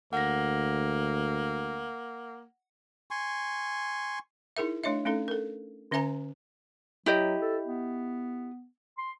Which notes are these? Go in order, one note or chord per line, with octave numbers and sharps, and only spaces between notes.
D2 A#3 F#5 A#6
G#5 C6 C#6
D#4 E4 G#4 A#4 E5
A3 D4 C#5 D#5 E5
A3 C#4 D#4 A4
A4 A#4
D3 C#4 C5 E5 G#5 A#5
F#3 E4 G4 D#5
A4
B3
C6